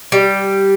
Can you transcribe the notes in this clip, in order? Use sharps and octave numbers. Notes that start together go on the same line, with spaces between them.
G3